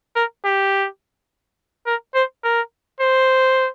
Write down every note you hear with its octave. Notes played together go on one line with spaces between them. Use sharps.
A#4
G4
A#4
C5
A#4
C5